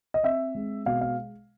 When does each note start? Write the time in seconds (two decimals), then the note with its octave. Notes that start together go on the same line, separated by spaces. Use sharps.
0.14 D#5
0.23 C4 E5
0.55 G#3
0.86 B2 F5
1.01 F5